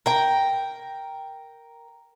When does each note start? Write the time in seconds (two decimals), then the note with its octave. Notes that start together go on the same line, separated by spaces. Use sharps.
0.06 A#4 G5